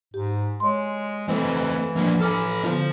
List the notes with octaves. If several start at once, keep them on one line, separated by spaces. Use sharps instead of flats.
G#2 G4
G#3 C#5 C6
E3 A3 C4
F3 A#3 D4
A4 B4 G#5 D6 F6
D3 B3 F4 A4 C5